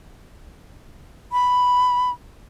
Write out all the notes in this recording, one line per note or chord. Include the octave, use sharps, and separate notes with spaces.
B5